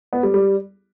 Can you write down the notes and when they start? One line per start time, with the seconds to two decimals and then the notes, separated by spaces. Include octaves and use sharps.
0.13 B3
0.23 G3
0.34 G3